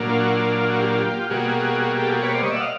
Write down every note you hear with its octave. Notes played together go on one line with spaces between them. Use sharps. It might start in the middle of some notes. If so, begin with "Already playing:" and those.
Already playing: A#2 F#3 A#3 D4
F4
F#4
F4
F4
F#4
F4 G4
F4 G4
B2 G3 A#3 F#4 G#4
G4 A4
F#4 G#4
B4 C#5
C5 D5
C#5 D#5
D5 E5
F#5
D#5 F5